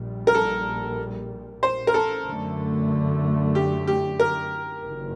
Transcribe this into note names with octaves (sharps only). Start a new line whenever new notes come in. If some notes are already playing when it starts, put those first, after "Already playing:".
Already playing: A#1 A#2 G3
A#4
A4
C5
A#4
A4
F#2 D3 A3
G4
G4
A#4
F#1 F#2 D#3